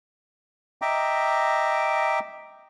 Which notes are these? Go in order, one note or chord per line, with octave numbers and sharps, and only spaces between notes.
D#5 E5 G5 A#5 D6